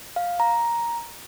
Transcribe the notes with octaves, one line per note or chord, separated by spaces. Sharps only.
F5
A#5